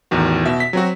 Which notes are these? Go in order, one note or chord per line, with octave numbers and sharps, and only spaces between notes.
A1 E2 D#3 F#4
B2 E5
B6
F#3 C4 F#4